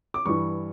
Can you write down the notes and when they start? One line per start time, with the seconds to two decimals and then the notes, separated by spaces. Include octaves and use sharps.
0.14 D6
0.26 G2 E3 C#6